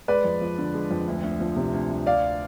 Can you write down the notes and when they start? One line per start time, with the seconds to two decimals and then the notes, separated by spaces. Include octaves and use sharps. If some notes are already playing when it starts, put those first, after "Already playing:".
0.08 G#3 B4 D5
0.24 F2
0.41 F3
0.58 D3
0.74 G#3
0.91 F2
1.07 D2
1.23 D2
1.40 F3
1.56 C3
1.73 D2
1.90 D2
2.06 D2 D5 F5